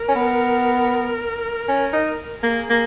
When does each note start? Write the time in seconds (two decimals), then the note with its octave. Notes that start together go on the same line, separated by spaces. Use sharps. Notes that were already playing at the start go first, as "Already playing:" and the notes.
Already playing: A#4
0.09 C#4
0.16 B3
1.69 C#4
1.93 D#4
2.43 A#3 G#4
2.70 A#3